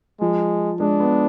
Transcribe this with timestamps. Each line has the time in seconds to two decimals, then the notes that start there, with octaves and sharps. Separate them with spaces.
0.21 F3 G#3
0.80 G#3 D4
1.00 B3